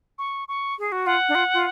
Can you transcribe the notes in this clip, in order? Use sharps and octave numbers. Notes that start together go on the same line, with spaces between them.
C#6
C#6
G#4
F#4
F4 F#5
D4
F4
F4